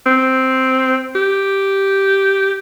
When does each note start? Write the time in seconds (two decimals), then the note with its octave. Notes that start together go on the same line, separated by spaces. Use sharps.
0.06 C4
1.16 G4